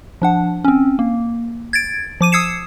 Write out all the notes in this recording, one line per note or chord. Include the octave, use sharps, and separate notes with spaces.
F3 D4 F#5
C4 C#4
A#3
G#6 A6 D7
F3 D6 D#7
D#6 E6 G#6 C7 C#7 E7